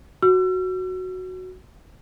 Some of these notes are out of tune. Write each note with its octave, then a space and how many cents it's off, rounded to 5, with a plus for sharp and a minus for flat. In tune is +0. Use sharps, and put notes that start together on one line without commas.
F#4 +0 E6 +40